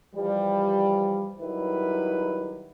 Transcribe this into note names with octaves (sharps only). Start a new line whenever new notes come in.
E3 F3 G3
D#3 F#3 G3 E4 B4